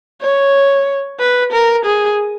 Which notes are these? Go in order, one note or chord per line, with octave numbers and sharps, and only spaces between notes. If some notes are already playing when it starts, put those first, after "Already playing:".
C#5
B4
A#4
G#4